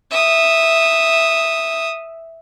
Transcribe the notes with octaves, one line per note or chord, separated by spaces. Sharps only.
E5 D#6